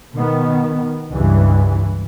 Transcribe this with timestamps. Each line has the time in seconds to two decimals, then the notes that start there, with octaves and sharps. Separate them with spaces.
0.15 B2 D#3 B3
1.13 C#2 G2 C#3 E3